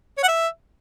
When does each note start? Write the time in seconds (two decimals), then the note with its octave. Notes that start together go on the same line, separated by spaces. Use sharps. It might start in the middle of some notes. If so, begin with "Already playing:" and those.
0.18 C#5
0.23 F#5
0.28 E5